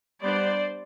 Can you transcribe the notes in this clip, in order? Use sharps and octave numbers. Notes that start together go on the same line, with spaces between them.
G3 B3 D4 C5 D5